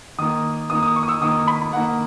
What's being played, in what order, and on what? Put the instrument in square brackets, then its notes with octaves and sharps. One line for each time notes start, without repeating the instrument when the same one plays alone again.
[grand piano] D#3 A#3 D#6
D#3 A#3 D#6
D#6
C#6
D#6
E6
D#3 A#3 D#6
B5
D#3 A#3 F#5